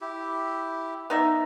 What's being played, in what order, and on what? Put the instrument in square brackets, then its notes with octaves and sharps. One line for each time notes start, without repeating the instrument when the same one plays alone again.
[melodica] E4 G4
[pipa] B3 D#4 E5